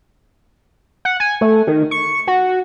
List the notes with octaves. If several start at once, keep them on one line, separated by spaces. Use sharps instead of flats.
F#5
G#5
A3
D#3
C#6
F#4